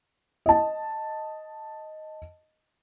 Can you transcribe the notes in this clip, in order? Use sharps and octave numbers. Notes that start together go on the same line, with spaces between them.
D#5 A5